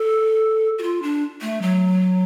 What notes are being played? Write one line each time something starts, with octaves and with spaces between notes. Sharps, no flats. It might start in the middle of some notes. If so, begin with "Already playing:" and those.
Already playing: A4
F#4
F4
D4
A3
F#3